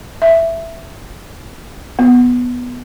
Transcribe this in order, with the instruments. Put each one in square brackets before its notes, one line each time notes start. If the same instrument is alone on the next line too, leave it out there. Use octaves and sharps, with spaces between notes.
[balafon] E5
B3